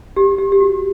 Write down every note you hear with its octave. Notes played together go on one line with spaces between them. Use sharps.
G4
G4
G4
F#4